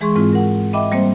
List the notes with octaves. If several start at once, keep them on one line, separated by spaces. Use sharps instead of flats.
E3 G#3 G#4 C6 C#6
G#2 E3 G#3 C4 E4 F4
A#4 F#5
D#5 E5 G5 B5 D6
G3 A#3 C4 C5